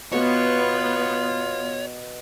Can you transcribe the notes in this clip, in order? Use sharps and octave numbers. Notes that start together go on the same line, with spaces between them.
B2 B3 F4 C#5